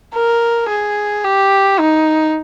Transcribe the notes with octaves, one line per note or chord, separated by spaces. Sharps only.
A#4
G#4
G4
D#4